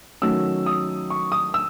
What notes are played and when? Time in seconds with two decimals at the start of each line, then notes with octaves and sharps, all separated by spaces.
0.22 D#3 F#3 A3 C#4 E6
0.66 D#6
1.10 C#6
1.32 D#6
1.54 E6